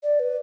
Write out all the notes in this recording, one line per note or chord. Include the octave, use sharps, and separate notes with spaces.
D5
B4